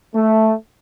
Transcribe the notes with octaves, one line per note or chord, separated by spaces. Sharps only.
A3